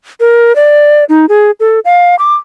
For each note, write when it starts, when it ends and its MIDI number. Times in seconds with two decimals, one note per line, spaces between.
0.20 0.55 70
0.56 1.04 74
1.09 1.26 63
1.29 1.51 68
1.60 1.80 69
1.85 2.16 77
2.19 2.34 86